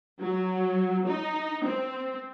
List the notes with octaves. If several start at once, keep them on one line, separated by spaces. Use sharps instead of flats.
F#3
D#4
C4